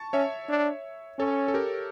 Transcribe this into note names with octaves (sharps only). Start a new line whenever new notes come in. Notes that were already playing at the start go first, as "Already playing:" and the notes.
Already playing: A5 C#6
C#4 C#5 E5
D4
C#4 A4 C#5
A4
G4 A#4